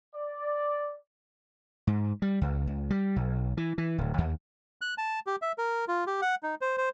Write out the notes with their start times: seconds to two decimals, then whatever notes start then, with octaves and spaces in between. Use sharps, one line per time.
0.15 D5
1.87 G#2
2.22 G3
2.41 C#2
2.67 C#2
2.90 G3
3.16 B1
3.57 E3
3.78 E3
3.98 D1
4.18 D#2
4.81 F#6
4.98 A5
5.27 G4
5.42 E5
5.58 A#4
5.88 F4
6.07 G4
6.22 F#5
6.43 D#4
6.61 C5
6.78 C5